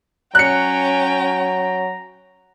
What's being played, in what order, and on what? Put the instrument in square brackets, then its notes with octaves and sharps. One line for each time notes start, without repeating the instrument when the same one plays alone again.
[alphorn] F#3 [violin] C#4 G5 [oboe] A#5 [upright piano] F#6 C#7